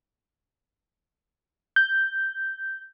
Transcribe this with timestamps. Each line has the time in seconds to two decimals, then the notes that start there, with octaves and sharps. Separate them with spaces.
1.76 G6